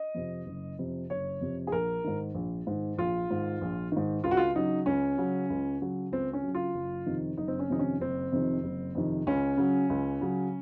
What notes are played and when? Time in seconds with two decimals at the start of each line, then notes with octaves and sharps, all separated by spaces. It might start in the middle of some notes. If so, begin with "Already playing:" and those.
Already playing: D#5
0.15 F2 C3
0.46 F#1
0.79 F2 C3
1.10 F#1 C#5
1.41 F2 C3
1.67 G#4
1.72 A#1 A#4
2.04 G#2 D#3
2.35 A#1
2.67 G#2 D#3
2.98 A#1 F4
3.30 G#2 D#3
3.61 A#1
3.92 G#2 D#3
4.24 C#2 F4
4.31 F#4
4.37 F4
4.55 C#3 F#3 D#4
4.86 C#2 C#4
5.18 C#3 F#3
5.50 C#2
5.81 C#3 F#3
6.12 C#2 C4
6.33 C#4
6.43 C#3 F#3
6.55 F4
6.74 F#1
7.06 F2 C3 D#3
7.37 F#1 D#4
7.48 C4
7.59 C#4
7.70 F2 C3 D#3 D#4
7.79 C#4
8.00 F#1 C4
8.32 F2 C3 D#3
8.64 F#1
8.95 F2 C3 D#3
9.26 C#2 C#4
9.57 C#3 F#3
9.89 C#2
10.21 C#3 F#3